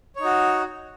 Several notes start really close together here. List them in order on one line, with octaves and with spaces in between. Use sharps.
C#5 D#4 F#4